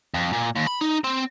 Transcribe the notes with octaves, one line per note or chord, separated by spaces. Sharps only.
F2
A#2
D#2
B5
D#4
C4